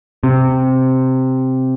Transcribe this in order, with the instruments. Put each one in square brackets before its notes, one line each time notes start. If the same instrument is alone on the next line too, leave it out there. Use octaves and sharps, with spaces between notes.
[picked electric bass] C3